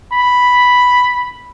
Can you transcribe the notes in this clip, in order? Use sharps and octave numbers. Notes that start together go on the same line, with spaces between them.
B5